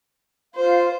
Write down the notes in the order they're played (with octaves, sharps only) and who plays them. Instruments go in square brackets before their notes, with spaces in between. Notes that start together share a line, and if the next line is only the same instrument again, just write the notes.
[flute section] F4 F5 [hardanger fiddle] C5